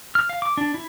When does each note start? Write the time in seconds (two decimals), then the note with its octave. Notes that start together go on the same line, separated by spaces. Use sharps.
0.15 F6
0.29 F5
0.42 D6
0.57 D4
0.74 E4